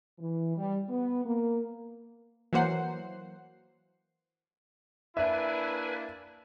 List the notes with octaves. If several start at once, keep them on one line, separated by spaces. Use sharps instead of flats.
E3
G3
B3
A#3
E3 F#3 A#3 C5 F#5 C7
A#3 D4 E4 B4 E5 G#5